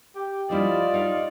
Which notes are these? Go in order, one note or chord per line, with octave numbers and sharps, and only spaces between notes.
G4
F3 G3 E4 F4 D5 D#5
G3 D#4 F5